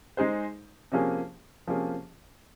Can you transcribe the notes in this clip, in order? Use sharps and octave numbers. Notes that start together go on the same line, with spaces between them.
G#3 D#4 G#4 C5
C3 F3 A#3 C#4 G#4
C3 F3 A#3 C#4 G#4